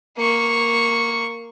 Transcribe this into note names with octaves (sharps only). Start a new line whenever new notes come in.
A#3 C#6